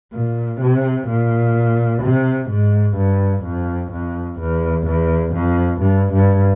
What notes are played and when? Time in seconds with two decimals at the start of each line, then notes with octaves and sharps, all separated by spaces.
0.13 A#2
0.61 C3
1.08 A#2
2.03 C3
2.50 G#2
2.97 G2
3.44 F2
3.92 F2
4.40 E2
4.87 E2
5.34 F2
5.81 G2
6.13 G2